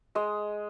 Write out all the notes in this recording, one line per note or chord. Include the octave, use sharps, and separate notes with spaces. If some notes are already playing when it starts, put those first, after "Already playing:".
G#3 D#5